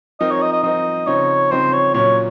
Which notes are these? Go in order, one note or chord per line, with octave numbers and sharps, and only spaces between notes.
F3 C4 D#4 A#4 D#5
C#5
D#5
D#5
F3 C4 D#4 A#4 D#5
C#3 F3 C4 D#4 C#5
C#3 F3 C4 D#4 C5
C#5
A#2 F#3 C#4 C#5